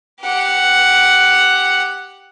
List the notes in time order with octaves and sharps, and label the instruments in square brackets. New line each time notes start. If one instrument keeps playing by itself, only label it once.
[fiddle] G4 F#5